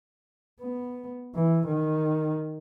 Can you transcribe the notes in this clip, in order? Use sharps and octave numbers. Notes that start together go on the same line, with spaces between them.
B3
E3
D#3